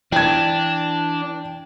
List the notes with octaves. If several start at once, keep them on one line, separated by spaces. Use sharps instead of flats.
E3 D4 G5 G#6